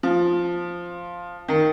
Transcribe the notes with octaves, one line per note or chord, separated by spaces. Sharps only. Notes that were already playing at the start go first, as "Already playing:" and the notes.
F3
D#3